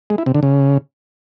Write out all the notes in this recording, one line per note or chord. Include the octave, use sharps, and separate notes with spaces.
G#3
E4
C3
D3
C#3